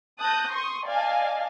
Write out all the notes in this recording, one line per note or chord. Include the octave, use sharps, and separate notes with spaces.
A5 D#6 F#6 G6 A#6
C6 C#6 D#6
D5 D#5 F5 G#5 A5